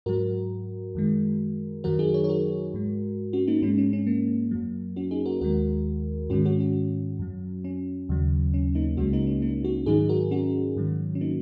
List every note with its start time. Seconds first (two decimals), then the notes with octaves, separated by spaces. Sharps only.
0.06 G#2 F#3 F#4 A#4
0.95 F#2 D#3 G#3
1.84 F#2 D#3 F#3 F#4 A#4
1.99 D#4 G#4
2.14 G#4 C#5
2.24 C#5
2.29 F#4 A#4
2.74 G#2 G#3
3.33 C#4 F#4
3.47 A#3 D#4
3.62 G#2 G#3 C#4
3.78 C#4
3.93 C#4
4.07 A#3
4.51 F#2 F#3
4.96 C#4 F#4
5.11 D#4 G#4
5.26 F#4 A#4
5.41 D#2 D#3 G#3 F#4 A#4
6.30 G#2 D#3 G#3 C#4 F#4
6.45 C#4 F#4
6.60 C#4 F#4
7.19 F#2 F#3
7.64 C#4
8.09 D#2 C#3 F#3
8.54 C#4
8.75 A#3 D#4
8.97 C#2 C#3 G#3 C#4 F#4
9.13 A#3 D#4
9.27 C#4
9.42 A#3 D#4
9.64 C#4 F#4
9.86 G#2 D#3 F#3 D#4 G#4
10.09 F#4 A#4
10.31 C#4 F#4
10.77 G#2 D#3 F#3
11.15 C#4
11.21 A#3 D#4